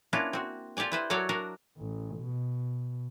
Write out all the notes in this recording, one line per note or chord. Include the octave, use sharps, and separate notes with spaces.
A#3 B3 C#4 D4 E4 F4
C4 F#4
F4 G4 A4 D5 G#5
E4 B4 C5
F#3 F#4 A4 A#4 C#5 D5
D4 F#4 A#4
A1
B2